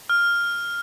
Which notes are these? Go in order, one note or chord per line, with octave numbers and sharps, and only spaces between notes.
F6